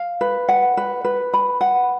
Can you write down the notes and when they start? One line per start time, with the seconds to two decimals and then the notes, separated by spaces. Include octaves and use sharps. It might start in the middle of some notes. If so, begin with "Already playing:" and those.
Already playing: F5
0.21 B4
0.48 F#5
0.77 B4
1.04 B4
1.33 B5
1.61 F#5